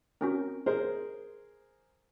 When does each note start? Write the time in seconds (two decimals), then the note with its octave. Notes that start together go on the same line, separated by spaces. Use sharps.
0.21 C4 C#4 F#4 A#4
0.66 G#4 A#4 C5